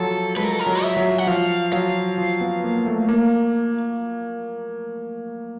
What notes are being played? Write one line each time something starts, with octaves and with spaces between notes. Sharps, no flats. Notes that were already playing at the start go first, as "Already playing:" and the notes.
Already playing: F3 F#3 A4
G#3 B4
A#4
A4
A#4
F#3
E5
F#3
F#5
F3 F5
F#3 F5
F3
B3
A#3
A3
A#3